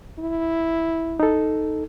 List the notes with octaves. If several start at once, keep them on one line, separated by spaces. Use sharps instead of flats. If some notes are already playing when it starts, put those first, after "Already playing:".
E4
D#4 A4